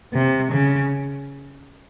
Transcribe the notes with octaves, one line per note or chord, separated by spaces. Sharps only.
C3
C#3